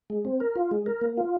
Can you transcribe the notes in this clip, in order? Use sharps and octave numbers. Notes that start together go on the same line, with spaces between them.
G#3
C4
A#4
F4
G#3
A#4
A#3
F4